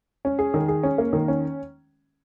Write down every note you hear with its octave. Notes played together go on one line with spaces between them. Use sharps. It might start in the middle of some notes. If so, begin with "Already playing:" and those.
C#4
G#4
D#3
G#4
C#4
A#3
D#3
C#4